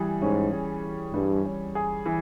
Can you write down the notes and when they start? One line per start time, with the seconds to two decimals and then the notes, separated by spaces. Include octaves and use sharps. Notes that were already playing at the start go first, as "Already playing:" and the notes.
Already playing: E3 G3 G#4
0.21 G#2 C#4
0.52 G#4
0.83 E3
1.14 G2 G3
1.45 C#4
1.75 G#4
2.06 E3